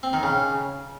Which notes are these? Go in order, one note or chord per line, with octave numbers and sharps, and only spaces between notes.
C4
D#3
C#3